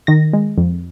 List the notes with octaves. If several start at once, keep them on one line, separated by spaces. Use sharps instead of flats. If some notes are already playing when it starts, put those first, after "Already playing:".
D#3 A#6
G#3
F2